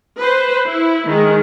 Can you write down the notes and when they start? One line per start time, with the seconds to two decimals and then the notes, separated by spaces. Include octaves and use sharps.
0.18 B4 C5
0.67 E4
1.08 D#3 G#3